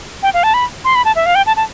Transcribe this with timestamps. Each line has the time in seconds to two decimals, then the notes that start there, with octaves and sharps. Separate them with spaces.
0.23 G5
0.34 F5
0.43 A5
0.54 B5
0.85 C6
0.95 B5
1.05 A5
1.16 E5
1.26 F5
1.35 G5
1.46 A5
1.57 A5